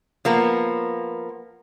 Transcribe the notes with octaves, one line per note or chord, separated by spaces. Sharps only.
F3 A#3 B3